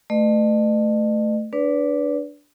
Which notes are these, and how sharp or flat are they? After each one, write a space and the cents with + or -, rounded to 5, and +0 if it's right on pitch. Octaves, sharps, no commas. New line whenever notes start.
A3 +0 B4 +0 D#5 -45
D4 +0 B4 +0 D5 -35